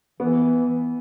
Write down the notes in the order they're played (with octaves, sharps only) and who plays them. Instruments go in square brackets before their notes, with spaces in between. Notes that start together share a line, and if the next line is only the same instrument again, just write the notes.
[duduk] E3 [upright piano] B3